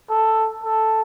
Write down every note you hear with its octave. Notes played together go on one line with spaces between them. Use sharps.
A4
A4